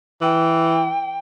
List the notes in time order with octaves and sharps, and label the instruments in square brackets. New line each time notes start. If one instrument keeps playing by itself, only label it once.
[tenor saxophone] E3 [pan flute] G5